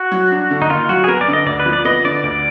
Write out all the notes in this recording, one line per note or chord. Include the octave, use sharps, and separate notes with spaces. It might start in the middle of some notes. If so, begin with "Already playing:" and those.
Already playing: F#4
F#3
D4
D3
D#4
D#2 F4
F#3 F#4
G#4
B3 A#4
D5
D3
D#5
D2 D5
B4
F3
D5
B3 D#5
D3 D5
D2 D5